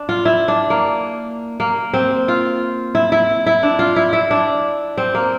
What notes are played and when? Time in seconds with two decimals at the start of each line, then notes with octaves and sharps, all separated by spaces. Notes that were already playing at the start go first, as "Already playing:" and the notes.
Already playing: D4
0.09 F4
0.25 E4
0.48 D4
0.70 A#3
1.60 A#3
1.94 C4
2.28 F4
2.95 E4
3.12 E4
3.46 E4
3.63 D4
3.79 F4
3.96 E4
4.13 E4
4.31 D4
4.97 C4
5.15 A#3